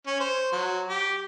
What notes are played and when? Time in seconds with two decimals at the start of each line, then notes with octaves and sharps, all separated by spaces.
0.07 C#4
0.20 C5
0.52 F#3
0.89 G4